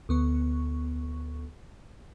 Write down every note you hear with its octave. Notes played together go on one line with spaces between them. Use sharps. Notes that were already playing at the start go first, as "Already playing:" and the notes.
D2 B3 C#6